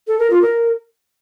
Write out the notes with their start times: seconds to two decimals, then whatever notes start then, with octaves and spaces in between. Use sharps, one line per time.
0.08 A4
0.19 A#4
0.30 F4
0.42 A#4